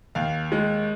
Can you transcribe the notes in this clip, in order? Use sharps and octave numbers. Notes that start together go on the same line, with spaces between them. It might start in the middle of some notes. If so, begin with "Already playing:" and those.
D#2 F5
G#3